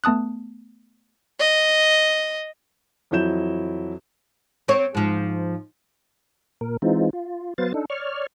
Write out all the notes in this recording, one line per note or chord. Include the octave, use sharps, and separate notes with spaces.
A3 B3 A5 D#6 F#6
D#5
F2 E3 F#3 E4 G6 E7
C4 C#5
G#2 F3
A#2 A#4
E3 G#3 C4 D#4 F4
F4
F#3 B3 B4 C5 F5 A6
D4 D#4 A4
C#5 D5 C#6 F6